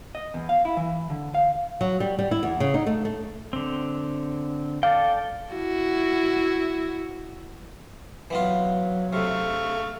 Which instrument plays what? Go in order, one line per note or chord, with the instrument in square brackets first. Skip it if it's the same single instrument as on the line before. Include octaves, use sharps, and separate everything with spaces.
[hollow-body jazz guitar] D#5
E2
F5
E4
E3
D3
F5
[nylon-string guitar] F#3
G3
G3
E4
E2
C#3
D#4
A3
A3
[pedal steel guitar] D3 C4
[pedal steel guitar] A4 D5 G5 [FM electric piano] F5
[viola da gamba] E4 F#4
[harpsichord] E3 B3 F4 [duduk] F#3
[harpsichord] C3 [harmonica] A3 F5 C#6